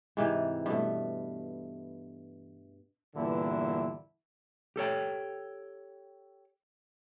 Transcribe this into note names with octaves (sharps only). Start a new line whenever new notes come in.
G#2 C3 E3
G2 B2 A3
E2 G2 A#2 D3 E3 E4
G4 A4 C#5 G5